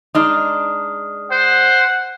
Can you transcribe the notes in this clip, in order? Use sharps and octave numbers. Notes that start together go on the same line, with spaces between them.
G#3 D4 D#4 D#6 F6
C5 F#5